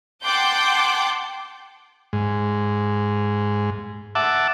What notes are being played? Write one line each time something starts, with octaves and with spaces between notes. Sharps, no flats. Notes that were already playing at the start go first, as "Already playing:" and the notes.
F#5 G5 A5 C6 D6 G6
G#2
E5 F#5 A5 D6